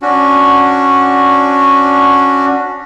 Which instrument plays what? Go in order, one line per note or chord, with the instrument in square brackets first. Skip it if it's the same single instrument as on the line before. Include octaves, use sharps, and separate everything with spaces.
[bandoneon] C#4 D4 F#4